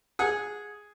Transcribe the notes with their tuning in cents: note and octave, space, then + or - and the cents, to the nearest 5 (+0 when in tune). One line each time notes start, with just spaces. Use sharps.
G#4 +0 F#5 -20